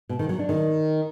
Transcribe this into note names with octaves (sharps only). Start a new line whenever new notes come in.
B2
D#3
F#3
D4
D#3